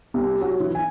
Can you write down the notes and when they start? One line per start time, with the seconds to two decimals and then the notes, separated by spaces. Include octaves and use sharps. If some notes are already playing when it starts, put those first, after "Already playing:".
0.14 C2
0.41 F#3
0.60 E3
0.75 G#5